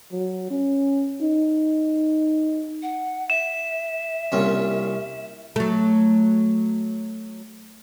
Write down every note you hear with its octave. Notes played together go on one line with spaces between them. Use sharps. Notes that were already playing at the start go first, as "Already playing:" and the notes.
F#3
C#4
D#4
F#5
E5 E7
C2 A#2 C#4
F#3 A3